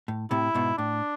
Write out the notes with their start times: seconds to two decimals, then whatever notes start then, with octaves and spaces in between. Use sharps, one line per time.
0.08 A2
0.31 A2 C3 E4
0.54 G#2 B2
0.78 A2 D4